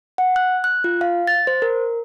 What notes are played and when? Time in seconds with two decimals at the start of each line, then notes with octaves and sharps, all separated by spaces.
0.18 F#5
0.36 F#6
0.64 F#6
0.84 F4
1.01 F5
1.27 A6
1.47 C5
1.62 A#4